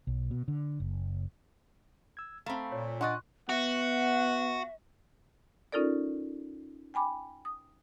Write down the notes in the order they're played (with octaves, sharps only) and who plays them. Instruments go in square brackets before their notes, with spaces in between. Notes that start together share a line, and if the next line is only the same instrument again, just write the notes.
[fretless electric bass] B1
B2
D3
F#1
[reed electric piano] E6 G#6
[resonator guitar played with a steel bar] A3 C4 [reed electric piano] F5 A#5 B5
[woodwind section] A#2 [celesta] C#5
[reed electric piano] D4 [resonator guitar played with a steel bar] D5 D#5 F#5 [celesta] C6 C#6 F#6
[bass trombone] B3 [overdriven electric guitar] F#4 [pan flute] E5 [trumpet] F#5
[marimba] C#4 D#4 F4 A4 A#4 D5
G5 G#5 B5 D6
D#6